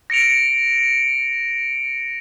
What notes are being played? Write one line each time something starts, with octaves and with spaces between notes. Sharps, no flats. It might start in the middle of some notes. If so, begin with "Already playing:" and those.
A#6 C#7 D7 F7